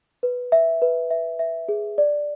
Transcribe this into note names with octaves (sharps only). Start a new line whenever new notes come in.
B4
E5
B4
E5
E5
G#4
D5